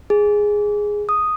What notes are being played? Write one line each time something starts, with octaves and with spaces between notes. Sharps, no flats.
G#4
D#6